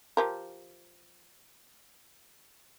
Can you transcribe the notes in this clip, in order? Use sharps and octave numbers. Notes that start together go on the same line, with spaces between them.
F3 G4 A#4